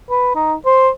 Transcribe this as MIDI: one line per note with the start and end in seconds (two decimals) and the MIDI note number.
0.10 0.31 71
0.36 0.54 63
0.66 0.89 72